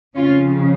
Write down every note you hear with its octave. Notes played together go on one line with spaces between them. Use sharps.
F2 C#3 C#4 F4